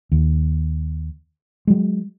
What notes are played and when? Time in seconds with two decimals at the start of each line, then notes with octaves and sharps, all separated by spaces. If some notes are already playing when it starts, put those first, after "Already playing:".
0.12 D#2
1.67 F#3 G#3